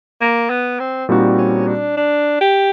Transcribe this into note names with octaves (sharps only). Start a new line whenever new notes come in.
A#3
B3
C4
A#2 G3 C4 D#4 F#4
C#4
D4
D4
G4